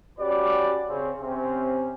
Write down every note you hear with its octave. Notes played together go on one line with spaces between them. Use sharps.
C#4 F#4 G4 B4 D5
C#3 C4 C#4
C3 C4 C#4